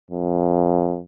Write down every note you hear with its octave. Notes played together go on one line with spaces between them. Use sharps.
F2